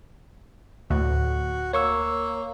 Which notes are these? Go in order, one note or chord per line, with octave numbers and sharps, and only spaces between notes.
D2 A2 F#4
A#3 C#5 C#6 E6